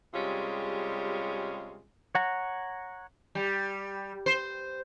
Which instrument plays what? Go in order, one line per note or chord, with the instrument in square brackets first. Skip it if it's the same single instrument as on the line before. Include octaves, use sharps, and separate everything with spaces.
[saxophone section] C3 G3 G#3 C#4 F4 G#4
[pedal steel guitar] C#5 F#5 A#5
[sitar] G3
C5